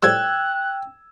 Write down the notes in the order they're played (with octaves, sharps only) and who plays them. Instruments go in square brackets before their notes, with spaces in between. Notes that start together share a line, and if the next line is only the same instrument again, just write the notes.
[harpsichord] A2 F3 G3 [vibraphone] G5 [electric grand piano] E6 G#6 [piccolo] F#6